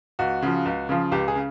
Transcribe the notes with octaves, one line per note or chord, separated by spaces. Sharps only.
C#2 F#4
C#3 F3
C#2
C#3 F3
C#2 G4
G#4
C#3